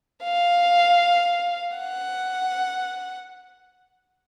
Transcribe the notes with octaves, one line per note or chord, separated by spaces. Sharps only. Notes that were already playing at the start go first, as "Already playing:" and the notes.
F5
F#5